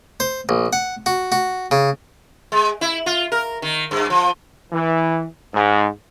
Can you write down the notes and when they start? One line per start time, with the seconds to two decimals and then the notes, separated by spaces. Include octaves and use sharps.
0.20 C5
0.49 A#1
0.73 F#5
1.06 F#4
1.32 F#4
1.71 C#3
2.52 G#3
2.81 E4
3.06 F4
3.32 A#4
3.62 D#3
3.91 G2
4.10 F3
4.72 E3
5.54 G#2